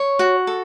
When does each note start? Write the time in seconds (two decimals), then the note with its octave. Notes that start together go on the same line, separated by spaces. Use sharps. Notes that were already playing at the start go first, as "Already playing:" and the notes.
Already playing: C#5
0.19 F#4
0.47 A4